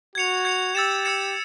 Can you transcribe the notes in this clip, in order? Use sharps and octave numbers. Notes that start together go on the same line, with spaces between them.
F#4 G#6 C#7 F7
G#6 C#7 F7
G4 E6 A6 C#7 E7
E6 A6 C#7 E7